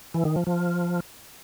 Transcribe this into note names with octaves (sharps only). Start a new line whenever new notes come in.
E3
D#3
F3
F3